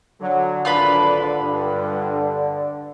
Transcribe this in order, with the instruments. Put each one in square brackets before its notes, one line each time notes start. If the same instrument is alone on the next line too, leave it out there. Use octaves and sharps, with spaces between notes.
[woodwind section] D3 [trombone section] F#3
[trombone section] G#1 D4 [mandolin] F4 B4 B5
[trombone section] G2